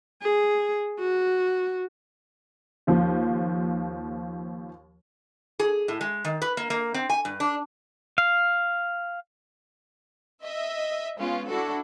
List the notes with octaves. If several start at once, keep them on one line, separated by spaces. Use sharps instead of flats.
G#4
F#4
D#2 F3
G#4
A2
G#3
D#3
B4
A#3
A#3
C4
G#5
G2
D4
F5
D#5 E5
G#3 B3 C#4 F4
D4 E4 F#4 A4